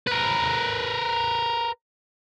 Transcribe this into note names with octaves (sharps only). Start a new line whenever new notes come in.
A#4 B4